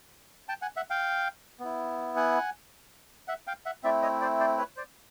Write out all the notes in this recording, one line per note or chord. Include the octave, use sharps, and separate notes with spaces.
G5 A5
F#5 G#5
E5 F#5
F5 G5
B3 E4
F#5 G#5
E5 F#5
F5 G5
E5 F#5
A3 C4 E4 D5 E5
C#5 D#5
C5 D5
C5 D5
B4 C#5
C5 D5